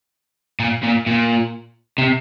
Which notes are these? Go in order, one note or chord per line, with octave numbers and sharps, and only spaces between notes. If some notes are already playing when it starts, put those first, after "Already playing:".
A#2
A#2
A#2
C3